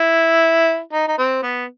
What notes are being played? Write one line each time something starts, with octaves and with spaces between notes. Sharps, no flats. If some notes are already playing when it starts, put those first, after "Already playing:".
Already playing: E4
D#4
D#4
C4
B3